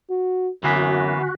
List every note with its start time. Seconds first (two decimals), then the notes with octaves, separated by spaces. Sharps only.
0.10 F#4
0.64 F#2 D3 E3 A#3 B3 F#4 G#5 B6